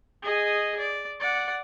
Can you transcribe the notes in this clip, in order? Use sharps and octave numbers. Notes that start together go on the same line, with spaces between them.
G#4 D#5
D5
D5 F#5